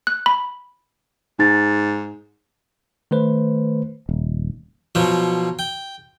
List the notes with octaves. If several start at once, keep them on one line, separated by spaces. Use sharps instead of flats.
F#6
B5
G#2 D#4 A6
D#3 A3 B4 C5
D#1
B2 F3 F#3
G5